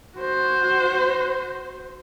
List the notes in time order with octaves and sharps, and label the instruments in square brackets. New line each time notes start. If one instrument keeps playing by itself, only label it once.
[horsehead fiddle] F#4 C5